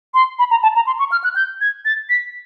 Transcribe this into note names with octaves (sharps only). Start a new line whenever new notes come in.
C6
B5
A#5
A5
A#5
C6
C#6
F6
F#6
G6
G#6
A6
B6